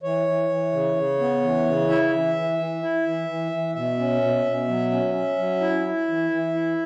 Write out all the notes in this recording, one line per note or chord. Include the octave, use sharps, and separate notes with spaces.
E3 C#5
E3
E3
C#3
C#3
B3
E3
C#3
E4 E5
E3
E3
E3
E4
E3
E3
E3
B2 E5
C#4
B2
B2
F#3
C#4
C#4
F#3
E4
E4
E3
E3
E4